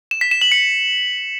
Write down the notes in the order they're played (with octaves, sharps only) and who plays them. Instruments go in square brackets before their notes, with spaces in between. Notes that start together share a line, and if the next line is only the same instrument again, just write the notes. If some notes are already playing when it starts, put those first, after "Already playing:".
[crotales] E7
B6
E7
F#7
C#7